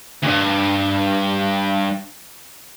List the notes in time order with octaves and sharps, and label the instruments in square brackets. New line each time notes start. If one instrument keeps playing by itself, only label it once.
[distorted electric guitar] D2 G2